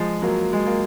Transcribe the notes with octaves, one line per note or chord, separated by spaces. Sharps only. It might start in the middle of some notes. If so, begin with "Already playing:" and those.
Already playing: F3 G#3
F#3 A#3
G#3
A#3